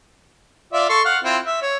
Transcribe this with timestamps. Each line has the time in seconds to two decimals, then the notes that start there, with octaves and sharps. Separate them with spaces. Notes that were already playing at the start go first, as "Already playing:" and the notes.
0.73 F4 D5 E5
0.89 A4 C6 C#6
1.05 F5 F#5
1.24 C4 E4 F4
1.45 E5
1.62 C#5